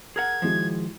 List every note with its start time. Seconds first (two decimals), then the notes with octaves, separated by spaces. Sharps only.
0.16 G#4 A#4 F#5 G#6
0.42 D#3 F3 G#3 E4 F#4